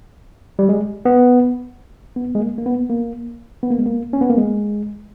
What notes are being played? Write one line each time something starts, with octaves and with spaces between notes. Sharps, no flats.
G3
G#3
B3
B3
G#3
A#3
A#3
B3
A#3
B3
A#3
G#3
A#3
C#4
B3
A#3
G#3